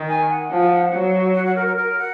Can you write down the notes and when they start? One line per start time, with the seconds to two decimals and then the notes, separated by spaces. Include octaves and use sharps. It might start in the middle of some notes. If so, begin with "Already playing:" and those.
Already playing: D#3
0.08 G#5
0.30 F#5
0.51 F3
0.93 F#3
1.35 F#5
1.46 F#5
1.56 A#4
1.67 A#4
1.77 A#4
1.98 F#5